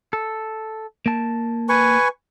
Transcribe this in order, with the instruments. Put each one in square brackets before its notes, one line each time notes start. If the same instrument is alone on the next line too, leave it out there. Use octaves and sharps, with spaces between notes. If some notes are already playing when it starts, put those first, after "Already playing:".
[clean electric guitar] A4
A#3 A5
[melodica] B4 G#5 C#6